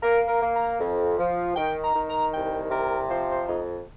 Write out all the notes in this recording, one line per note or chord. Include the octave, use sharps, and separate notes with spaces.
A#3 A#4
A#4
A#3
A#5
F2
F3
D#3 G5
A#5
D#3
A#5
C2 G5
C3 A#4
F3 C5
C5
F2 D#4